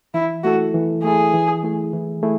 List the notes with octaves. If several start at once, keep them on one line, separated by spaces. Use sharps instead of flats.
E3 E4
A3 E4 F#4 A4
E3
A3 E4 G#4 A4
E3
A3 E4 G#4
E3
A3 E4 G#4